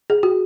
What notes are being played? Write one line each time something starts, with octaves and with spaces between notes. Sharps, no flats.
G#4
F#4